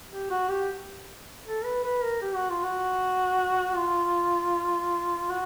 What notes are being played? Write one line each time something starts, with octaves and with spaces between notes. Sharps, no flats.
G4
F#4
G4
A4
B4
B4
A#4
G4
F#4
F4
F#4
F4
F#4